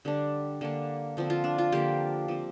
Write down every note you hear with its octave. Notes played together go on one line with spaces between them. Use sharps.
D3 G3 D4
D3 A#3 D4
D3 F3 C4
F4
D4
F4
D3 F3 A#3 D4 G4
F3 C4